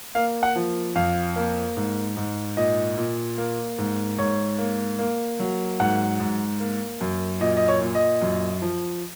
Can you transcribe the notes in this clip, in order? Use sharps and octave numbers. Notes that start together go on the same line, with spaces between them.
A#3 F5
F#5
F3
F2 F5
A#3
G#2
G#2
A#2 D#5
A#2
A#3
G#2
G#2 C#5
A#3
A#3
F#3
G#2 F#5
G#2
A#3
F#2
A#2 D#5
D#5
C#5
A#2
D#5
F#2
F3